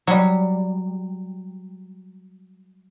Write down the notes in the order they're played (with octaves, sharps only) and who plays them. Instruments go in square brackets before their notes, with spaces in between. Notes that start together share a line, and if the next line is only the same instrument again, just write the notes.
[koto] F#3 G3